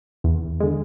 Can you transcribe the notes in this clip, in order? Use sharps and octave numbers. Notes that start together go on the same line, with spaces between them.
E2
D3 G#3